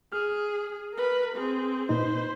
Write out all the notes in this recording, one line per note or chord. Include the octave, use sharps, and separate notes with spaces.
G#4 F6
A#4 B4
C4 G#4
A#2 D#4 B4 C5